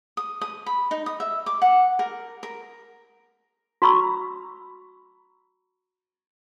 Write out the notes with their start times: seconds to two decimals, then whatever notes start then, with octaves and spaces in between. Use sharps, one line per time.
0.17 D#6
0.41 D#6
0.66 B5
0.91 D#4
1.06 D#6
1.20 E5
1.46 D6
1.62 F#5
1.99 A#4
2.43 A#4
3.82 F#4 A#5 B5 C#6 E6